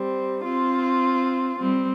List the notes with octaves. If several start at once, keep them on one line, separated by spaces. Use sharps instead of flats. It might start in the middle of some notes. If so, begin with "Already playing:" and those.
Already playing: G3 C4
C4 F4
G3 C4